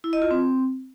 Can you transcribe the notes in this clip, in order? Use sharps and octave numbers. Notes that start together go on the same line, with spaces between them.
E4
D#5
F4
C4